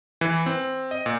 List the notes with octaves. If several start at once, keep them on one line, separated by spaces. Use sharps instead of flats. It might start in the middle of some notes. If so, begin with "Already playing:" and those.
E3
C4
D#5
A#2